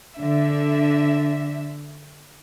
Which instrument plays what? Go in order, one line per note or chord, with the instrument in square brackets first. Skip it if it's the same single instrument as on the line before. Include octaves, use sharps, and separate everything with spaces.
[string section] D3 E5